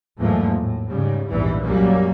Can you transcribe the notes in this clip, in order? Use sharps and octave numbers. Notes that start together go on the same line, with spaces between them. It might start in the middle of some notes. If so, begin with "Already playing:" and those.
E2 G#2 F3 F#3 A3 A#3
A2
G#2 C#3 G3
A#1 E2 G#2 E3 G3
C2 F#2 F#3 G3 A#3 C#4